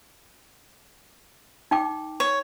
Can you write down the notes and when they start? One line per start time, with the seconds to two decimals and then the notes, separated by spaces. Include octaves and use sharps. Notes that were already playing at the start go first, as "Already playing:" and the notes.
1.71 D#4 G5 D6
2.20 C#5